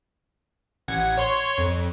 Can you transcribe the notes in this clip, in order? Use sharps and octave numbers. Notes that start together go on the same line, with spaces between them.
A1 F#5 G#6
C#5 C6 C#6
F2